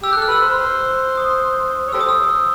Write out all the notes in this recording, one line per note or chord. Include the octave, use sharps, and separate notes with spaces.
G4 E6
A4 F#6
F6
B4 E6
C5
D#6
C#5
G4 A4 C5 E6
D#6
E6